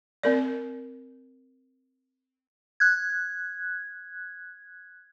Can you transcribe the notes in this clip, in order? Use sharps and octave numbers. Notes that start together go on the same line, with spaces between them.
C4 A#4 D5
F#6 G#6